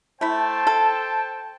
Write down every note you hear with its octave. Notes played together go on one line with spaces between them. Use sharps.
A3 E4 C5 G5 A5
A4